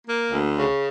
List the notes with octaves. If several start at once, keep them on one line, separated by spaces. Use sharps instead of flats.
A#3
D2
C#3